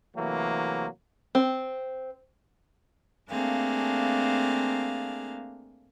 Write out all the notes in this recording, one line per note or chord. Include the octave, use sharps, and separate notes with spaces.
C3 E3 F#3 A3 A#3
C4
A3 A#3 C4 D4 G#4 F5